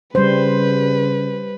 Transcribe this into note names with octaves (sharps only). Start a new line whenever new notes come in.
C#3 G3 B4 C5